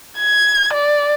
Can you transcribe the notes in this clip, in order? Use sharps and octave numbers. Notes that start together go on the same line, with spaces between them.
G#6
D5